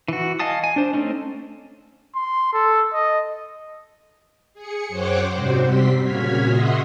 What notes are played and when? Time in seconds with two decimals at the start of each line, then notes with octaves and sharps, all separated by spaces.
0.08 E3 F#4
0.39 D#5 F5 G#5 A5 D#6
0.64 G#5
0.76 D4 C5
0.93 A3 C4 C#4 D#4
2.15 C6
2.53 A4
2.93 D#5
4.54 G#4 C#7
4.88 F#2 C5 C#5 F#5 G5 D6
5.32 G#2 C3 G3 F#4 C5
5.64 C3 G3 C4 C6 B6
6.03 A#2 C#3 F#4 F6 G#6 B6
6.47 D#5 E5 F#5 C6 C#6 D#6